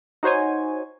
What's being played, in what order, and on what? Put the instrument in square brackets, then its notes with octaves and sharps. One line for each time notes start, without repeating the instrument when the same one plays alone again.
[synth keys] D#4 F#4 C5 C#5 G#5